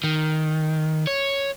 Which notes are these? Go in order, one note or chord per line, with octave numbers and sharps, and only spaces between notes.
D#3
C#5